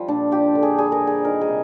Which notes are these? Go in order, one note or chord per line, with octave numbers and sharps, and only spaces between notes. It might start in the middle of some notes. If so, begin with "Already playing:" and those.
Already playing: F3 G3
A#2 D4
F3 G4
D3
G#4
G3 G#4
A#4
G3
G#4
D#3 A#4
G#4
C3